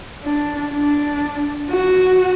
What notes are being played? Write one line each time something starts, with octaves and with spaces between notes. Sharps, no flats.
D4
D4
F#4